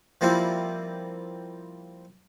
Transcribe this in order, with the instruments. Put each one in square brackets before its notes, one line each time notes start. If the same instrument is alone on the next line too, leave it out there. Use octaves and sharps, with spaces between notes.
[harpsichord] F3 G3 A#3 C4 E4 F4